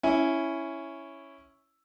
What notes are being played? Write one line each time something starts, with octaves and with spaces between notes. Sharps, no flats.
C#4 E4